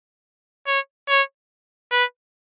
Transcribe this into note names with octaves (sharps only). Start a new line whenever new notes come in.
C#5
C#5
B4